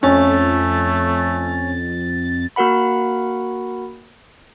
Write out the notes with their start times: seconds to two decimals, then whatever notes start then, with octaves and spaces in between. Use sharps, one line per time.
0.03 F2 A3 C#4 A6
2.56 A#3 F#4 A#4 F#5 B5